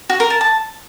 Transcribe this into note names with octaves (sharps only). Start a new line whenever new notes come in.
F#4
A#4
A5
A5